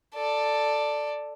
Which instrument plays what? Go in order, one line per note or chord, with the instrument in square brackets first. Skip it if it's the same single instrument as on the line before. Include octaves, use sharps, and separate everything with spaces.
[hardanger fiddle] A4 D5